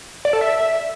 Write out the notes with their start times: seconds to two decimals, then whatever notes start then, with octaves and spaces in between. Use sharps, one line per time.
0.25 D5
0.33 A4
0.41 E5